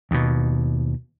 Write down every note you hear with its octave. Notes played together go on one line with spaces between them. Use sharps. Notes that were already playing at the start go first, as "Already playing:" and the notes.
D#2 B2